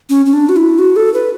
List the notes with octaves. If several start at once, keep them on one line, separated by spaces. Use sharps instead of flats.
C#4
C#4
D4
F#4
E4
F#4
A4
B4